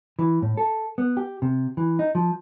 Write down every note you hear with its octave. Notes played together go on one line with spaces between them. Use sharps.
E3
A2
A4
B3
G4
C3
E3
D#4
F3